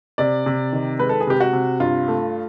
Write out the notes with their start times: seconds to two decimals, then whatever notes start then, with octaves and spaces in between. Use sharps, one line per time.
0.18 C3 D5
0.46 C3
0.73 D#3
0.99 G#3 B4
1.09 A4
1.20 G#4
1.27 C3 G4
1.40 F#4
1.53 C3
1.80 G2 F4
2.08 A3